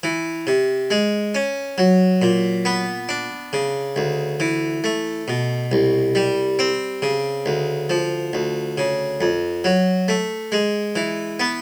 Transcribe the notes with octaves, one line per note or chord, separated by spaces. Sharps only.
E3
C3
G#3
C#4
F#3
A#2
B3
D4
C#3
D2
E3
A3
B2
C2
G3
C4
C#3
D2
F3
D2
C#3
F2
F#3
A3
G#3
E3
B3